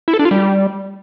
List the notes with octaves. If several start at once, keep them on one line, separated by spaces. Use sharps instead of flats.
E4
A4
D4
F4
G3